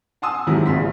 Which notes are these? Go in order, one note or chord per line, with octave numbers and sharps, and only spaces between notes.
F#5 G#5 A5 C6 D#6 E6
G#2 C3 D#3 F#3 E4
A#1 C#3 F4 C6 B6